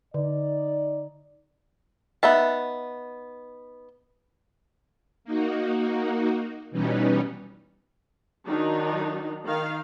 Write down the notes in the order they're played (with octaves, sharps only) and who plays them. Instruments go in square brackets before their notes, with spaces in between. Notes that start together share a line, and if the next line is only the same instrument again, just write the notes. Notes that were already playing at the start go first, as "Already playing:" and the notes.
[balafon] D3 [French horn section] D#4 D5
[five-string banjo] B3 D#4 E5 A5
[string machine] A#3 D#4 F#4
B2 E3 G3 B3 C#4 D#4
[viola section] D#3 F#3 D4 D#4
D#3 F5